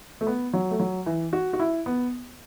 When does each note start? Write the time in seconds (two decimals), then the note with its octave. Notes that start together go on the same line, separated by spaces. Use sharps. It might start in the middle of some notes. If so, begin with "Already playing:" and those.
0.21 A3
0.27 B3
0.53 F#3
0.71 A3
0.80 F#3
1.06 E3
1.33 F#4
1.53 F#4
1.60 E4
1.86 B3